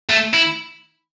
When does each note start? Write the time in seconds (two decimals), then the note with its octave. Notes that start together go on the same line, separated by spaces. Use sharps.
0.09 A3
0.33 E4